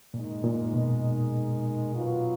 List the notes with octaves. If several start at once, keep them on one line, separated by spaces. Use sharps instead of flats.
A#2 D#3 G#3 D#4
A#2
B2
F#3 B3 F4 B4